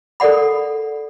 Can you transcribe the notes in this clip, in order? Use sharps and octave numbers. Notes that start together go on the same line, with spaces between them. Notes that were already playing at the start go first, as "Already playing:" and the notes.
A4 A#4 D5 F#5 B5